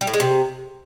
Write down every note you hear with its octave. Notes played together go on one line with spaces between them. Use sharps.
G3
A2
G#3
C3